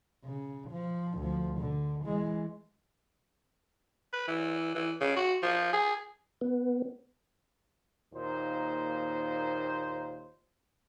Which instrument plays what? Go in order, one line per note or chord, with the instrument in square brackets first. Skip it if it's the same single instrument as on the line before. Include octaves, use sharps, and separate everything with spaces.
[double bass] C#3
F3
D2 F3
D3
E3 G#3
[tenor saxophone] B4
E3
E3
C#3
F#4
F3
G#4
[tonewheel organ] B3
[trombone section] D#2 A#2 D#4 C5